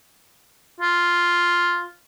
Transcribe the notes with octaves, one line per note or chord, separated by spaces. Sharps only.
F4